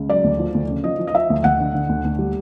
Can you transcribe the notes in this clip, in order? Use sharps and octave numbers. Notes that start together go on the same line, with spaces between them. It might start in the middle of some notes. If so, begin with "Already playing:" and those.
Already playing: C#2
F#3 D5
D2
F3
D2
C#3
F3 D#5
F3
D#5
F3 E5
D2
D2 F#5
D3
D3
D2
D2
G3